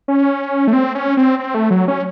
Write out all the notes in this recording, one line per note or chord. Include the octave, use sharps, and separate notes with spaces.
C#4
A3
C4
C#4
C4
C4
A3
F#3
C#4